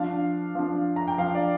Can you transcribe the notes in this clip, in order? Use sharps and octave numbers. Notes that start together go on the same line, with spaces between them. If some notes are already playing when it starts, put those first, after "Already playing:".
Already playing: F3 D4 F5
F3 D4
A#5
G5
F3 D4 F5
D5